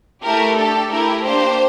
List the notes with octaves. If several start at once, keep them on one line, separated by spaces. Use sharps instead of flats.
A3 E4 G4 A#4
D4 G4 A4
A3 E4 G4 A#4
A#3 D4 G4 C5